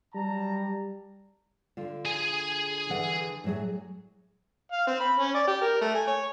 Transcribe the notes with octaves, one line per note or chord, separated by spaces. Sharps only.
F#3 G3 A5 A#5
D3 F4
G#4 G#5
D3 E3 F#5
A2 F#3 G#4
F5
C4
B5
C#4
D5
G4
A#4
A3
G#5
C#5